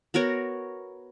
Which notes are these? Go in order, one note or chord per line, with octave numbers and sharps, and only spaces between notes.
B3 F#4 A#4 C#5